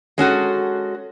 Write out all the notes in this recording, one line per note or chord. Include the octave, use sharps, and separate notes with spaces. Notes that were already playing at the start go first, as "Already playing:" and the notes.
G#3 C#4 F#4 A4